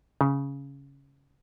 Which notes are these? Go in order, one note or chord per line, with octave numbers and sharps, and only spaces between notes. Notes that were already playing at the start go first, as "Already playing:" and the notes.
C#3